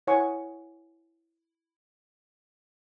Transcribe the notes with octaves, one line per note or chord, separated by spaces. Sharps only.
E4 C#5 F#5 G#5 C#6